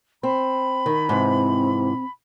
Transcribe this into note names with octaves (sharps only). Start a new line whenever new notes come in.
C4 B5
D#3
G#2 C3 E3 C4